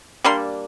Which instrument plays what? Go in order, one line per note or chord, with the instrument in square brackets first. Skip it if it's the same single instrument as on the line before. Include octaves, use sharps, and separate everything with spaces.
[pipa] G3 A#3 D4 C6